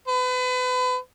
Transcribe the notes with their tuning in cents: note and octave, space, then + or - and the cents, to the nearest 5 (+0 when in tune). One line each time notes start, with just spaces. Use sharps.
B4 +35